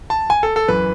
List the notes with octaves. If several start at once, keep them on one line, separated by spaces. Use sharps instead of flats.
A5
G#5
A4
A4
F#2 E3 B4